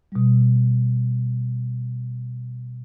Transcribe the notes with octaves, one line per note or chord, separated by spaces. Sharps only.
B2 G3